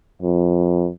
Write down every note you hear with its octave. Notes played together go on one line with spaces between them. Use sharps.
F2